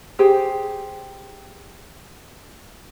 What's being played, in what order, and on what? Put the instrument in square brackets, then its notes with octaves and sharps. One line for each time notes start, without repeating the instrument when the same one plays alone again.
[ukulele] G4 G#4 C5